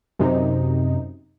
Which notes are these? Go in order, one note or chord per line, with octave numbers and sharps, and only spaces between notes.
F#2 C3 D#4